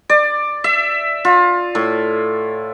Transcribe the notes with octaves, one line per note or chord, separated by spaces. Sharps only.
D5
E5
F4
A2